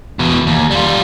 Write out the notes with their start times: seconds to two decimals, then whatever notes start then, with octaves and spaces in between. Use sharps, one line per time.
0.19 E2 B2
0.47 D#2
0.71 G3 F4